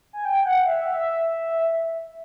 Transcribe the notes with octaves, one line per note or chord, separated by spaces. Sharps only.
G#5
G5
F#5
E5
E5